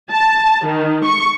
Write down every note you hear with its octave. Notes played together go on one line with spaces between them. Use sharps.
A5
D#3
C#6